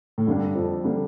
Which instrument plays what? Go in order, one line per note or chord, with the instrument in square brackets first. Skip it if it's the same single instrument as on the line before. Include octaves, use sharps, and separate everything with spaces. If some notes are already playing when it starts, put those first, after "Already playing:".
[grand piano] A2
[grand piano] G2 [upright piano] D3 G3 A#3 D4 A4
[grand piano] F2
[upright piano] D3 G3 A#3 D4 A4